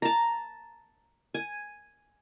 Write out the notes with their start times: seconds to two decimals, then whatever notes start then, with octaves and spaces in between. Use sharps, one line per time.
0.02 A5 A#5
1.34 G#5